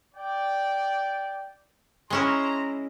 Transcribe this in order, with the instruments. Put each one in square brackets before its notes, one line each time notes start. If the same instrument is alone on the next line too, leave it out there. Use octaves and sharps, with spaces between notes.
[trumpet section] D5 G5
[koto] G#3 C#4 E4 [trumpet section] A#5 C6